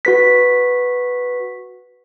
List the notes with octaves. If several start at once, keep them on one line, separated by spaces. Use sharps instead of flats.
F#4 B4 B6